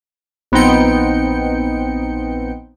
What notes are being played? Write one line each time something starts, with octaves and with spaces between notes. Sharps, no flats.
A#1 B3 C4 D#4 G5 C#7